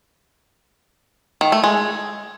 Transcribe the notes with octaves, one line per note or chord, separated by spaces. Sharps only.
D#3
A3
G#3